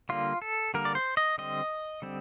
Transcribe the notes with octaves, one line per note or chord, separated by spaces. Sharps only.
D3 G3 A#3 F4
A4
D3 G3 A#3 A#4
D5
C5
D#5
D3 G3 C4 D#5
D3 G3 C4